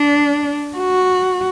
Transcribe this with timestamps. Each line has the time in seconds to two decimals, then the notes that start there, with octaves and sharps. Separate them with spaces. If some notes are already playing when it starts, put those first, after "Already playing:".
Already playing: D4
0.78 F#4